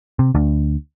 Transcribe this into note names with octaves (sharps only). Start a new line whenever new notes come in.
C3
D2